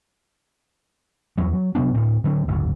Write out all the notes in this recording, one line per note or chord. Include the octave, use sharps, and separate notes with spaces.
E2 F#3
F#3
C3 F#3 B3 D4
D2 A2 C4
D3 F#3 A#3 C4
F#1 D2 G#2